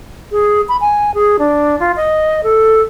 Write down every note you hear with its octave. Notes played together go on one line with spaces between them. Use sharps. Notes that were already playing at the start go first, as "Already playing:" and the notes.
G#4
B5
G#5
G#4
D4
F4
D#5
A4